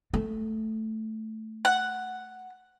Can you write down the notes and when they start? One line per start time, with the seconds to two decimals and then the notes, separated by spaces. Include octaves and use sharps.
0.14 A3
1.65 F#5